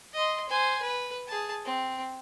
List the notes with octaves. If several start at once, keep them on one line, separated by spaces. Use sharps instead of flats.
D#5 C6
C5 G#5
B4
G#4 A5
C4